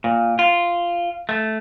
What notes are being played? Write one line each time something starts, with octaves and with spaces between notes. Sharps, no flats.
A#2
F4
A3